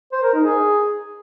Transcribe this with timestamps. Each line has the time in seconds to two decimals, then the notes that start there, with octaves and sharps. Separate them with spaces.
0.12 C5
0.23 A#4
0.34 D#4
0.44 G#4